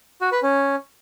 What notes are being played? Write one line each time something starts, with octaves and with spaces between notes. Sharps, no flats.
F#4
B4
C#4